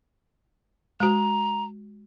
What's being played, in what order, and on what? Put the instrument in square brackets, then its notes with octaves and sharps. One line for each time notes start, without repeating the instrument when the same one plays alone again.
[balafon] G#3 F#4 [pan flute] A#5